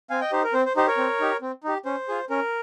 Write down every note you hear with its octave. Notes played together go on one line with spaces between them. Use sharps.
C4 F5 G#5
D#5 G5
D#4 G4 C5
A#4
C4 C5
C5
D#4 G4 C5
A#4 C#5
C4
D#4 G4
C4
D#4 G4
C#4 C5
F4 G#4
C#4 A#4